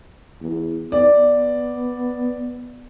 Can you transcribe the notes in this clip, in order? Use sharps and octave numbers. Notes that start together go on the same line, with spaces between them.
E2
B3 D5